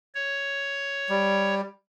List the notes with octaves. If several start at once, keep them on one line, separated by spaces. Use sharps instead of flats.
C#5
G3